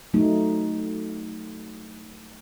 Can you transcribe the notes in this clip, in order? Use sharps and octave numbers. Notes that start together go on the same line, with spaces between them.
F#3 A3 D#4